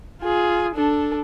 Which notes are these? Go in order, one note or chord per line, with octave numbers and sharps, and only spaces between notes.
F4 G#4
D4 A4